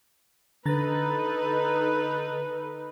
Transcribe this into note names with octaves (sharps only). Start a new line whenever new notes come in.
D3 D#4 A4 B4 A#5 A6